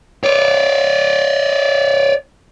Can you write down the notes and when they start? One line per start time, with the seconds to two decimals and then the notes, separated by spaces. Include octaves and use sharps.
0.24 C#5 D5